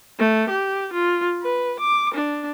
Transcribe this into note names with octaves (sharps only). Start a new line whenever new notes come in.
A3
G4
F4
B4
D6
D4